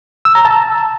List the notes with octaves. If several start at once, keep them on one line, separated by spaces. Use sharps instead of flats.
E6
A#5
A5